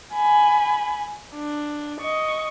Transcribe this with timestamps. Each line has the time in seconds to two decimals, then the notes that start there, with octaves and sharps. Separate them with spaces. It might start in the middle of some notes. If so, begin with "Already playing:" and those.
0.14 G#5 B5
1.34 D4
2.01 D#5 C#6